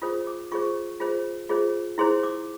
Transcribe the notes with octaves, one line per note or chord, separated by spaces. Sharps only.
F4 G#4 C5 D#6
D6
F4 G#4 C5 C#6
F4 G#4 C5
F4 G#4 C5
E4 G#4 C5 C6
D6